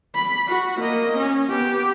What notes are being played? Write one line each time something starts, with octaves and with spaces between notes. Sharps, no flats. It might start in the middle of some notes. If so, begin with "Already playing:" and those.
B5
F#4
A#3 D#5
C#4
B3 G4